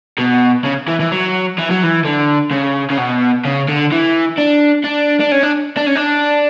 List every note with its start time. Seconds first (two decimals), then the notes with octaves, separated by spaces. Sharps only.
0.18 B2
0.65 C#3
0.88 E3
1.00 E3
1.12 F#3
1.59 E3
1.71 F#3
1.84 E3
2.05 D3
2.51 C#3
2.90 C#3
2.98 B2
3.45 C#3
3.69 D3
3.92 E3
4.38 D4
4.84 D4
5.20 D4
5.32 C#4
5.43 D4
5.77 D4
5.86 C#4
5.95 D4